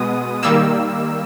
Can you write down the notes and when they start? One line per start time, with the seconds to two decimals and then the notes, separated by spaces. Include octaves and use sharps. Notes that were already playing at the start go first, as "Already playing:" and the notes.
Already playing: B2 G#3 B3 D#6
0.43 D#3 G3 A#3 E6